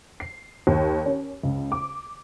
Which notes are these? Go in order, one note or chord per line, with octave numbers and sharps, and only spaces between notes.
C7
D#2
C#4
C#2
D6